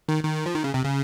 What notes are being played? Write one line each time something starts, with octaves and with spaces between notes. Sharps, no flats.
D#3
D#3
F3
D#3
C#3
C3
C#3